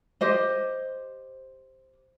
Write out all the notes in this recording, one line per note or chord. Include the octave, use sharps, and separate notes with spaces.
G4 C5 D#5